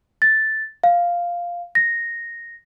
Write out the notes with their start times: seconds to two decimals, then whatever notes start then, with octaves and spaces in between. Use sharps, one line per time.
0.22 A6
0.84 F5
1.75 A#6